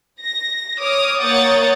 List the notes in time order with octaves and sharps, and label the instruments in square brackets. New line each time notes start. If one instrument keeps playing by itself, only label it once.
[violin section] A#6
C#5 D6 D#6 F6
A#3 C#5 F#5 D#6 G6 A6